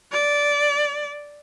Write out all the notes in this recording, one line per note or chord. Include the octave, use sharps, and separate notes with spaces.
D5